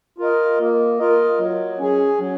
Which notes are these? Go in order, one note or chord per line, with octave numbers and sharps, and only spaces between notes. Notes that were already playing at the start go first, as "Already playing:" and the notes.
F4 A#4 D#5
A#3
F4 A#4 D#5
F#3
C#4 G#4
F#3